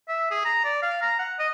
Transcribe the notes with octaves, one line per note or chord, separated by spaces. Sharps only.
E5
G#4
A#5
D5
F5
A#5
F#5
D#5